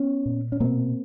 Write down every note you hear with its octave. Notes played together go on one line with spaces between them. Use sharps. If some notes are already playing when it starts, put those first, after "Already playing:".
Already playing: B3 C#4
A#2
C#4
B2 A#3 C4